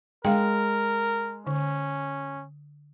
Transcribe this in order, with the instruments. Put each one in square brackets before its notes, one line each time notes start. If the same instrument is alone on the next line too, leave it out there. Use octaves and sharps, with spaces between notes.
[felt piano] G#3 [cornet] A#4 [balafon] F5 G5
[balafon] D3 [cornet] C#4